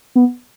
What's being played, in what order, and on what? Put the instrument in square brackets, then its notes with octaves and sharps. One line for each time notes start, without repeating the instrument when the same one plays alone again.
[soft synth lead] B3